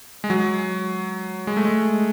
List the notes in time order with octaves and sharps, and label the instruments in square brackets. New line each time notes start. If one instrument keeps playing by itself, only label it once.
[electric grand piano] G#3
F#3
G#3
A3
G#3